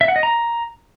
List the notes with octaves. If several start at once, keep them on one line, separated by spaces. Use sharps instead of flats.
E5
F#5
D#5
A#5